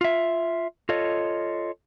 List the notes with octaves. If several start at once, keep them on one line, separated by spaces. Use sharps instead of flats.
F4 E5
F4 A4 C#5 D#5